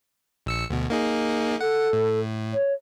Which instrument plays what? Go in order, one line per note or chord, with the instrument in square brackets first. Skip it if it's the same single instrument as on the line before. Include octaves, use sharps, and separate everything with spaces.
[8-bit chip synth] A#1 E6 C#7
D2 B2
A#3 D#4 G#4
[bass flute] A4 [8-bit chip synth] F#5
[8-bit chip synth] A2
[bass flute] C#5